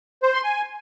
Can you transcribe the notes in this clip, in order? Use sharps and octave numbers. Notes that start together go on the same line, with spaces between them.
C5
C6
G#5